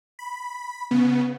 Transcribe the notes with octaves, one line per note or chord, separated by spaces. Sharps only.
B5
C#3 B3